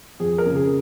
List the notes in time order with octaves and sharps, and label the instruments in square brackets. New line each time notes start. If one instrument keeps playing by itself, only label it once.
[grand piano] F2 G#4
A#4
C#3
G#4